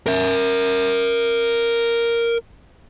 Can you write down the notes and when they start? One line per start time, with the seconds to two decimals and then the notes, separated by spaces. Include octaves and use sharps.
0.06 A#4 E5